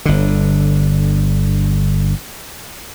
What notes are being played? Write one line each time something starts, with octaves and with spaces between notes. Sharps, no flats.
G1 D3